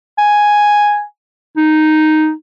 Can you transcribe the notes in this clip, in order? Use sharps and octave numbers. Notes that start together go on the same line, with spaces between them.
G#5
D#4